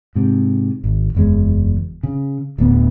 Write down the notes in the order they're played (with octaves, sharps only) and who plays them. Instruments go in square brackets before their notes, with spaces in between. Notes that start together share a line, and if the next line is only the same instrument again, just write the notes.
[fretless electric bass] G#2 C3
G#1
F#1 E2 G#3
C#3
D1 D2 B3